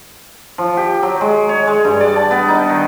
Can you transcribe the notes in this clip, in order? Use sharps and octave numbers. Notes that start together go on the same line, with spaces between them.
F3
G4
F#3
G#3
C#5
G#3
G2
D5
A5
B3
D#4
D#3